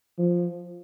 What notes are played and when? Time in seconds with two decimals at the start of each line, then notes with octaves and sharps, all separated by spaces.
0.19 F3